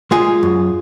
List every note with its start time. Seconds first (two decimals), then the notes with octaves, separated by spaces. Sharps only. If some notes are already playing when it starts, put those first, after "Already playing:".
0.11 G#3 F4 G#4
0.43 F#2